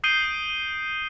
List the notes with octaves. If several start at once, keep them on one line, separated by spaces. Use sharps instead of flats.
D#6 G6 C7 D7 D#7 G7